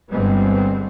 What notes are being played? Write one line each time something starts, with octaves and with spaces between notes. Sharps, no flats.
G1 G2 G3 G#3 B3 C4